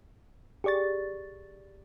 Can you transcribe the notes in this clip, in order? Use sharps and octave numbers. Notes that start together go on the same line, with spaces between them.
G4 G#4 D5 C#6 A6